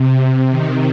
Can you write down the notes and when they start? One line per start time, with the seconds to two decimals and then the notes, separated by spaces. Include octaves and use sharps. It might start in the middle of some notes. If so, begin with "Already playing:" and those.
Already playing: C3
0.23 C3
0.51 D#3